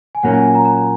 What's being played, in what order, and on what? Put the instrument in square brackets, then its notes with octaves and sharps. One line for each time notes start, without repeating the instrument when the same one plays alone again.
[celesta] G#5
[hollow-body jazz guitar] A#2 F#3 A#3 C#4 [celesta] F#5
[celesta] G#5
G#5
A#5
A#5